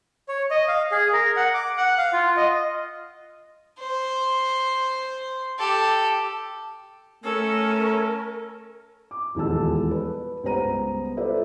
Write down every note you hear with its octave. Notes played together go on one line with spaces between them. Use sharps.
C#5
D#5
F5
G#4
A#4
F#5
D6
F#5
F5
F4
D#5
C5
G4 A4
A3 C#4 A4 A#4
D6
D#1 E2 F3 G#3 A5 E6
B4
C#2 G3 B3 C5 A#5 D#7
F4 A4 B4 C5 D5 E5